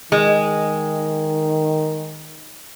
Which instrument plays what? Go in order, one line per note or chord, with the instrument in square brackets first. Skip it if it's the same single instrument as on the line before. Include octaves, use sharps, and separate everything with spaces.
[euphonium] D#3 [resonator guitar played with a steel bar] G#3